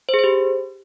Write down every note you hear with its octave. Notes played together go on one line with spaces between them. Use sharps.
C5
G#4
C5
G4